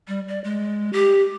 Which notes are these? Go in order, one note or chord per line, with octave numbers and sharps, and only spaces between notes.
G3
D5
G#3
G4